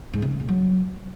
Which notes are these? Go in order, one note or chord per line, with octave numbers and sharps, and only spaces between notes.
G#2
C3
C#3
A#2
F#3